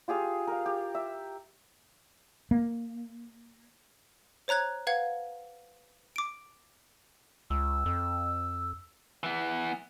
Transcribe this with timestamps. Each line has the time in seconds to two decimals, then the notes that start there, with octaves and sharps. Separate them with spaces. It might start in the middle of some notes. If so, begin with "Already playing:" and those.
0.08 F4 G4 G#4 F5
0.47 A#4 F5
0.66 G4
0.95 E5
2.51 A#3
4.48 C5 C#5 A#5 F#6 G#6
4.87 B4 F5 F#5 G#6
6.16 D6 D7
7.50 C#2 E6
7.86 F2
9.23 E3 B3